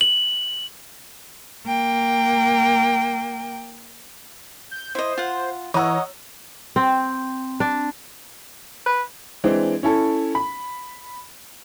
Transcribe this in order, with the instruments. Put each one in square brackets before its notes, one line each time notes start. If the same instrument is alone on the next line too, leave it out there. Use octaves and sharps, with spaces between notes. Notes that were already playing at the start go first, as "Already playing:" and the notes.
[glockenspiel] F#7
[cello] A#3 G5
[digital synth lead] G6
[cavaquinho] E4 D#5 [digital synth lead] C5
[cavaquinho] F4 F#5
[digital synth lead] E3 [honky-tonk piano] C#5 A#5 E6 [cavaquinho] D#5 F#5
[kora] C4
D4
[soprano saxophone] B4
[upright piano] E3 G#3 C4 D4
C#4 E4 A4
B5